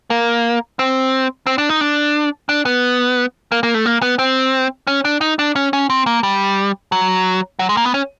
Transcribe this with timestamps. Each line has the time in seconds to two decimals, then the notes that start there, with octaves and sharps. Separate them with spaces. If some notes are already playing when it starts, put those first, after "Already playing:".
0.10 A#3
0.79 C4
1.47 C4
1.58 D4
1.69 D#4
1.81 D4
2.49 D4
2.65 B3
3.52 A#3
3.63 A#3
3.74 A3
3.86 A#3
4.02 B3
4.19 C4
4.87 C#4
5.05 D4
5.21 D#4
5.39 D4
5.56 C#4
5.73 C#4
5.90 C4
6.06 A#3
6.23 G3
6.92 F#3
7.59 F#3
7.69 G#3
7.77 A#3
7.85 B3
7.94 C#4